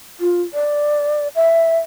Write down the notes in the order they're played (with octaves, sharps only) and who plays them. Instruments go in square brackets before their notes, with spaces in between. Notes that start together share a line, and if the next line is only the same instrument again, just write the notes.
[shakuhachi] F4
D5
E5